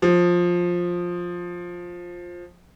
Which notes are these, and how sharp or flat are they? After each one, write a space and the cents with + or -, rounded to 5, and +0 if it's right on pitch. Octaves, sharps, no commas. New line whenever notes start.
F3 +10